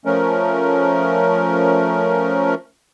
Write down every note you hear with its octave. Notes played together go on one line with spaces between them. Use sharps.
F3 A3 C#4 A#4